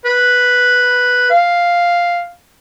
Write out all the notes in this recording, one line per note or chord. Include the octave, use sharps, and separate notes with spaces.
B4
F5